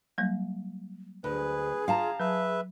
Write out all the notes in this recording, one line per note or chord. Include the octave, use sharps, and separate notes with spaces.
F#3 G3 A#3
D2 G#4 B4
F4 F5 A5 A#5
F#3 B4 E5